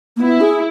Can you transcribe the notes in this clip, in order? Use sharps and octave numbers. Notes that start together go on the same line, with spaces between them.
A#3
B3 E4
G#4